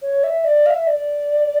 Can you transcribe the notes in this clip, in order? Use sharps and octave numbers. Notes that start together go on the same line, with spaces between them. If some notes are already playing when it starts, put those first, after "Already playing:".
C#5
E5
D5
F5
E5
D5